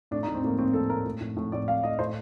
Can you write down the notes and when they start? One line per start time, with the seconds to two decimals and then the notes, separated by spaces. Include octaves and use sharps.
0.11 A2 D4
0.23 D#4
0.27 A2
0.35 C4
0.43 A2 A#3
0.59 A2 C4
0.73 A2 A4
0.89 A2 A#4
1.05 A2
1.21 A2
1.37 A2
1.52 A2 D5
1.68 A2 F5
1.83 A2 D#5
1.99 A2 C5